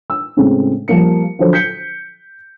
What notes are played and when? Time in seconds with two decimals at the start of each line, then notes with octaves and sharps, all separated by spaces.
0.10 E6
0.37 A2 C#3 G#3 A3 C4 C#4
0.88 F3 G3 A#3 C#7
1.39 D3 F3 F#3 F#4 A4 C5
1.53 G6 B6 C#7 G7